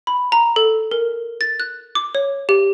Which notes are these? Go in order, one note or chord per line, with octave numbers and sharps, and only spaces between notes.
B5
A#5
A4
A#4
A6
F#6
D6
C#5
G4